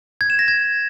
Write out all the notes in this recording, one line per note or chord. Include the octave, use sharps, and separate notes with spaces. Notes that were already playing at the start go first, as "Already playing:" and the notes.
G#6
E7
A#6
G#6